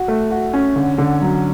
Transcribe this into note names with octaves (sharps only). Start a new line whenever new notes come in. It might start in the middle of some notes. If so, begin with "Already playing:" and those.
Already playing: F#4
A3
F#4
C#4
D3
D3
F#3